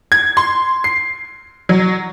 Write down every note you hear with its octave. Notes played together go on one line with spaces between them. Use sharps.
G#6
C6
C7
F#3